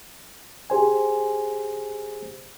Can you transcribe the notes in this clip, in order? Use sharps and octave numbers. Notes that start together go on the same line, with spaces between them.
G4 G#4 C5 G#5